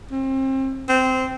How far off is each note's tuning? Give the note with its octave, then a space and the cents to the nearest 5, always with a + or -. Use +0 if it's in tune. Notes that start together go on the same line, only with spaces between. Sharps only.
C4 +30
C4 -15